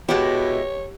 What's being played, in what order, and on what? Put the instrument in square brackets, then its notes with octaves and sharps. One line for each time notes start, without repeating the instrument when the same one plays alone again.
[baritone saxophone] B2 [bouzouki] G#3 E4 [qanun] G4 F#5 A5 [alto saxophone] C#5